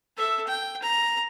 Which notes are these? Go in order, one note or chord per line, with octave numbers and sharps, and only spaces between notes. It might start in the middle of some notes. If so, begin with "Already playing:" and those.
A4 E5
G5
A#5